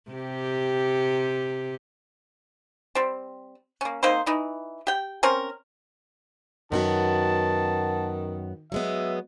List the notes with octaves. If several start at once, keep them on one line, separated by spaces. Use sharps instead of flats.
C3 G4
G3 C4
A#3 C#4
A#3 C4 D#4 C5
E3 D#4 E4
G4 G5
C4 C#4 A#4
F#2 D#3 B3 F#4 A5
F#3 G#3 B3 E5